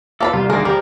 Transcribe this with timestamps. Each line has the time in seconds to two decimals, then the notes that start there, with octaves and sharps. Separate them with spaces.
0.21 A#3 E4 A4 B4 A#5 B5
0.33 C2 G3 F4
0.50 D2 D#3 G#3 A#3 G#4 A#4
0.65 F3 G3 G4 A#4